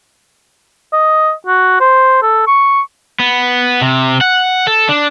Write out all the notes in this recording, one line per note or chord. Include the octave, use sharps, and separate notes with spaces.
D#5
F#4
C5
A4
C#6
B3
C3
F#5
A4
D4